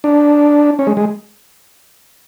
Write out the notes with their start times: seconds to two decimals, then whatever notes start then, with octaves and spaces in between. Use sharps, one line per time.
0.04 D4
0.79 C#4
0.87 G#3
0.97 G#3